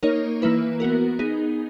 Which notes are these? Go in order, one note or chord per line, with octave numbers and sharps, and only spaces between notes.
A#3 D#4 A#4 C#5
E3 A#3 E4 B4
B3 F#4 A#4
B3 D#4 G#4